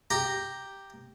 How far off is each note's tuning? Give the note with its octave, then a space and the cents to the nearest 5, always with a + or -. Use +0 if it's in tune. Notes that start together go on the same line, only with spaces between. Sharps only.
G4 +0 A#5 +0